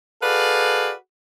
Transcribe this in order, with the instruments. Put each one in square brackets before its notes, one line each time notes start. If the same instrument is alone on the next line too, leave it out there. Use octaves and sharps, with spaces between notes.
[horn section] F#4 G#4 A4 B4 D5 F5